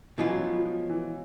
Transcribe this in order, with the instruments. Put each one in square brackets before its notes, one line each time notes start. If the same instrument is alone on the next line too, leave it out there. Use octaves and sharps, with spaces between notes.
[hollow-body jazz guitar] B2 G#3 C#4 F4 [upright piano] E3
[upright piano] F#3
F3
F3
F3
E3